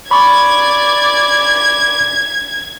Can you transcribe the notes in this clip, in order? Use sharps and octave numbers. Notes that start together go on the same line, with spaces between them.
D5 B5 C#6 G#6